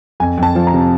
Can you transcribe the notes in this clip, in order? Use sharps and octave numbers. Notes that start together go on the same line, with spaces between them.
F2 G#5
F2
A5
F3
A#5
C3